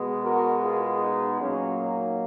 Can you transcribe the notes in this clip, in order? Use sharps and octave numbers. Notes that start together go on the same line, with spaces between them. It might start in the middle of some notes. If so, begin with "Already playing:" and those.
Already playing: B2 G#3 B3
F#4 A#4
F4 G#4
D#4
A#2 F#3 A#3 C#4
D#4